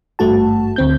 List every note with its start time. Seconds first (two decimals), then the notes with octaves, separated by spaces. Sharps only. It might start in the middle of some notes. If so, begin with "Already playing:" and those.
0.19 G#1 G2 A3 F#4 A5
0.76 D2 C4 G6